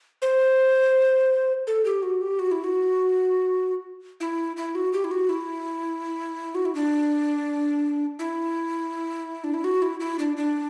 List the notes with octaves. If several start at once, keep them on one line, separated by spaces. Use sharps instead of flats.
C5
A4
G4
F#4
G4
F#4
E4
F#4
E4
E4
F#4
G4
E4
F#4
E4
F#4
E4
D4
E4
D4
E4
F#4
E4
E4
D4
D4